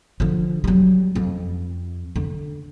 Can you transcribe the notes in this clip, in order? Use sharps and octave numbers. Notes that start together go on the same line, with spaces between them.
D3 F3
F#3 G3
F2
D3